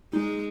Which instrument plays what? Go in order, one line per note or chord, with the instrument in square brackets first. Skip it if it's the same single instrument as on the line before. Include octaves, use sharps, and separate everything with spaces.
[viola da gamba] G#3 [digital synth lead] D#4